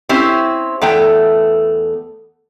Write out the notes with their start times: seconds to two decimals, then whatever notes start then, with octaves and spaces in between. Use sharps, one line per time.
0.09 C4 C#4 E4 G4 C5
0.82 E2 A3 B3 G5